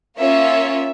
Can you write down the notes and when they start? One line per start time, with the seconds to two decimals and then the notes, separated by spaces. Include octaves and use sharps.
0.17 A#3 C#4 F4 C#5 E5